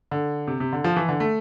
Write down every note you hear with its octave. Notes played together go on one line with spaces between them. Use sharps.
D3
C3
C3
D3
F3
E3
D3
A3